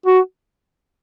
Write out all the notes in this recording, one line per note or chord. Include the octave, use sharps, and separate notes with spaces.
F#4